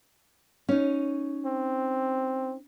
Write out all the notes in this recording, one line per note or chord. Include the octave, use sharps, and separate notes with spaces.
C#4 D#4
C4